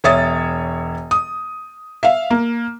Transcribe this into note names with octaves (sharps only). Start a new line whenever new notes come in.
E1 C#5 E5 D#6 A6
D#6
E5 F5
A#3